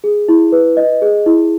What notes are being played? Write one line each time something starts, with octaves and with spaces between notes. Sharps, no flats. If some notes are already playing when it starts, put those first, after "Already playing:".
G#4
E4
B4
D#5
G#4
E4